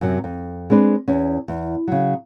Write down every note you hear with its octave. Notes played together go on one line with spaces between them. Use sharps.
F#2 C3 F#3
F2
G#3 C4 D4 B4
E2 C#4
E2
C#3 F#3